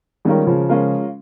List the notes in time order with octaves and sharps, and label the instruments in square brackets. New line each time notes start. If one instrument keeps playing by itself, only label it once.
[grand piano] D#3 G3 [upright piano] G#3 C#4 F4 A#4
[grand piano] C#3 F3
[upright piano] G#3 C#4 F4 A#4